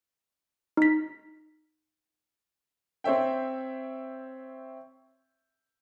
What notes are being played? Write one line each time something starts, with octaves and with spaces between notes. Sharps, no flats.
D#4 B6
C4 C5 C#5 E5 G5